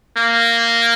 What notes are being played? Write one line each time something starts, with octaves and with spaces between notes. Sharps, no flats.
A#3